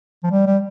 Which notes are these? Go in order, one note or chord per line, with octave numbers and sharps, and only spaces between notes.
F3
G3
G3